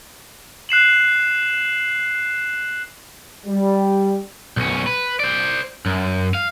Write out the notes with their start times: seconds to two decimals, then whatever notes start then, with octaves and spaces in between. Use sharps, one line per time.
0.69 F#6 C7 E7 F#7
3.47 G3
4.57 B1 C#4
4.87 B4
5.20 C5 D5
5.86 F#2
6.35 F5